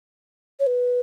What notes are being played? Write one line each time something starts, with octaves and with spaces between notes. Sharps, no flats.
C#5
B4